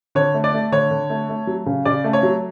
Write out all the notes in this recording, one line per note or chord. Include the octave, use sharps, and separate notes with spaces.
D3 C#5
A3
D5
A3
D3 C#5
D3
A3
A3
F#3
C#3
C#3 D5
A3
C#5
F#3